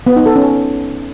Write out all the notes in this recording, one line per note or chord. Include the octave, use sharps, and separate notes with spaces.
B3
D#4
A4
C#4